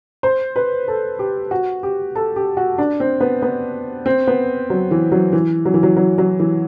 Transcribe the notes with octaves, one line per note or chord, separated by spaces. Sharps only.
C5
B4
A4
G4
F#4
G4
A4
G4
F#4
D4
C4
B3
B3
C4
B3
F#3
E3
F#3
E3
F#3
E3
F#3
F#3
F#3
E3